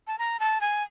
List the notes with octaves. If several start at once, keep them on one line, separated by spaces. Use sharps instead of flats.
A5
A#5
A5
G#5